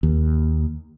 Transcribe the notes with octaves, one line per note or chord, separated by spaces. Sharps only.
D#2